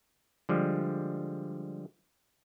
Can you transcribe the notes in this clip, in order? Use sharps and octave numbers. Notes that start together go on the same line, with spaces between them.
D3 F3 G3 G#3